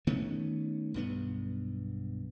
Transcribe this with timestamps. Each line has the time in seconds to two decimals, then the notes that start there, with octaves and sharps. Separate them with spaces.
0.07 D#3 A3 B3 C#4
0.94 B1 G2 B3